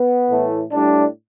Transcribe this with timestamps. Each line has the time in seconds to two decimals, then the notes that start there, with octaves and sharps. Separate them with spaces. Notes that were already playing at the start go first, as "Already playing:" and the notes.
Already playing: B3
0.29 A2 E3 A3
0.71 A2 G3 D4